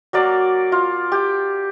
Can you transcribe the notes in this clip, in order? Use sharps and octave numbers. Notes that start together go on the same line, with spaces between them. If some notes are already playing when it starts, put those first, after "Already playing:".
F#3 A#3 D5
F4
G4